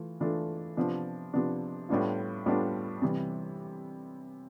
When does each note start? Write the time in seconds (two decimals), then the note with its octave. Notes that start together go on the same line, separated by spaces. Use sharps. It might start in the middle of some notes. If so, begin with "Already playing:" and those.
Already playing: E3 A3 F4
0.20 E3 A3 D4 F4 A4
0.77 C3 F3 B3 D4
1.33 C3 F3 B3 D4
1.89 A2 G3 B3 D4 F4
2.46 A2 G3 B3 D4 F4
3.02 C3 E3 G3